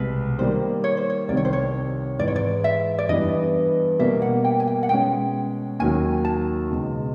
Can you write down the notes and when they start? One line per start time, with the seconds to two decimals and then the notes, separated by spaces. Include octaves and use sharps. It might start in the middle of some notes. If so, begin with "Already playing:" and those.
Already playing: C2 B2 G#3 B4
0.38 D#3 G3 A#3 C5
0.84 C#5
0.97 C5
1.10 C#5
1.28 C2 C3 D#3 G3 D5
1.37 C#5
1.45 C5
1.53 C#5
2.19 G#2 E3 G#3 D5
2.28 C#5
2.36 D5
2.64 E5
2.98 D5
3.09 G2 E3 G3 B3 D#5
3.99 B2 G3 A#3 E5
4.22 F#5
4.44 G5
4.60 G#5
4.67 G5
4.83 F#5
4.89 B2 G#3 C#4 G5
5.79 D#2 D#3 F#3 G#5
6.25 A5
6.70 C#2 B2 G#3